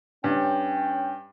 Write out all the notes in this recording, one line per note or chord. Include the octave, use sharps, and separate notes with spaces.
G2 C#4 G5